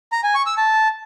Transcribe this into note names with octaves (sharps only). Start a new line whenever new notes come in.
A#5
G#5
C#6
E6
A5